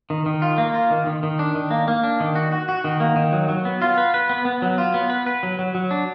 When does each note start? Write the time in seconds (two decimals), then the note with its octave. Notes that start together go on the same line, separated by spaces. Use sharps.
0.10 D#3
0.26 D#3
0.42 F4
0.58 A#3
0.74 F4
0.90 D#3
1.06 D#3
1.23 D#3
1.39 D4
1.55 D#3
1.71 A#3
1.88 A#3
2.04 D4
2.20 D#3
2.35 F#4
2.52 F#4
2.69 F#4
2.84 D#3
3.00 A#3
3.16 D#3
3.33 F#3
3.49 F#3
3.65 B3
3.82 F4
3.98 B4
4.14 B4
4.29 B3
4.45 B3
4.62 F#3
4.78 F4
4.94 B3
5.10 B4
5.26 B4
5.43 F#3
5.59 F#3
5.75 F#3
5.91 D4